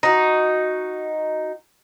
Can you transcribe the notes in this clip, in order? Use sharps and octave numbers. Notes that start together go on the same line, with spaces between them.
D#4 F#4